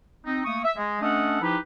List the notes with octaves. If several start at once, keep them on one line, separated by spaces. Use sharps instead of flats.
C4 D#4
A3 A#3 C#6 D#6
E5
G#3
A3 C#4 D4 A4 D#5 F#5
F3 D#4 E4 G4 B4